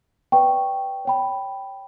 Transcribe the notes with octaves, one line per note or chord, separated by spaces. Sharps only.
B4 D5 G5 C#6
C#5 G5 B5